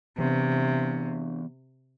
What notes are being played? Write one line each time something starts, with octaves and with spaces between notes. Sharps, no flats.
C3 E3 B3 D4